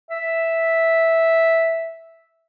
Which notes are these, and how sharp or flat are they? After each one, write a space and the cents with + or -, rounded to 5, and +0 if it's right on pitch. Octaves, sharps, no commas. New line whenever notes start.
E5 -5